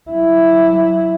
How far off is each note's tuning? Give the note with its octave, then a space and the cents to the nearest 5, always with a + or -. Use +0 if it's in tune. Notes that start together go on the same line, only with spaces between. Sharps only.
F#3 +0 E4 +0